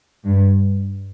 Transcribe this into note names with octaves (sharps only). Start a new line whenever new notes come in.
G2